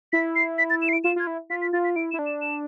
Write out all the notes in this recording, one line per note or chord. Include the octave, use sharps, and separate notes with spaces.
E4 B6
C7
B6
A6
E7
C7
D7
F4 E7
F4 G#6
E4
F4 B6
B6
F4 A6
B6
E4 D7
E4 E7
D4
E7
E7